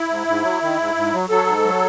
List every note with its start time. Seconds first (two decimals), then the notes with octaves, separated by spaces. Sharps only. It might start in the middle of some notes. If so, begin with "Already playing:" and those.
Already playing: E4
0.09 G#2
0.27 G#2
0.43 F#3
0.61 D#3
0.78 G#2
0.95 G#2
1.13 F#3
1.29 F#3 A4
1.46 G#2
1.64 F#3